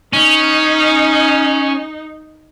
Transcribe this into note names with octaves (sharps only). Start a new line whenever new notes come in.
C#4 D#4